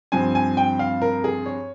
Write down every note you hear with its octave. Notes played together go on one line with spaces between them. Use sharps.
G2 F3 C4 G#5
G#5
G5
F5
A#4
G#4
C#5